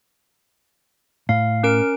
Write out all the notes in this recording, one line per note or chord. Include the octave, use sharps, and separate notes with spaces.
A2 F5
C#4 A#4 D7